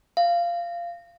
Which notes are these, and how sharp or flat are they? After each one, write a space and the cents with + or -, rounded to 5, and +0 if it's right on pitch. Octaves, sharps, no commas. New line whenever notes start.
F5 -15